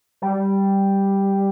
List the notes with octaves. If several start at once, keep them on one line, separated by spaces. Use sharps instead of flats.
G3